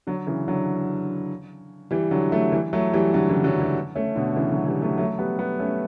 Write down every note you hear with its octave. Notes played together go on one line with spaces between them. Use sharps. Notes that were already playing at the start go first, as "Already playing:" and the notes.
D3 F#3
C#3 E3
D3 F#3
E3 G3
D3 F#3
F#3 A3
E3 G3
F#3 A3
E3 G3
D3 F#3
C#3 E3
D3 F#3
E3 G3
A3 C#4
B2 D3
C#3 E3
D3 F#3
E3 G3
F#3 A3
F#3 A3
G3 B3
G3 B3
A3 C#4